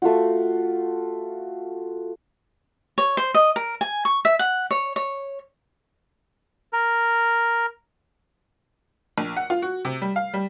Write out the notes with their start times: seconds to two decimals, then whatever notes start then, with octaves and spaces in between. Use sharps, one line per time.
0.02 A3 F4 F#4
2.98 C#5
3.17 C5
3.34 D#5
3.56 A#4
3.81 G#5
4.05 C#6
4.25 E5
4.39 F#5
4.71 C#5
4.96 C#5
6.73 A#4
9.18 A#1
9.37 F#5
9.50 F4
9.62 F#4
9.85 C3
10.01 G3
10.16 F5
10.34 G3